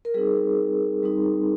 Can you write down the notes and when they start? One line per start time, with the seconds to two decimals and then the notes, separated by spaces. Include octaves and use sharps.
0.05 A#4
0.14 G3 C4 D#4 G#4
1.03 G3 C4 D#4